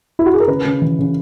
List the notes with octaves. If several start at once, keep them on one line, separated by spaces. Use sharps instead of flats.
E4
F#4
G#4
A#4
C#3 B4
C#3
E3
C#3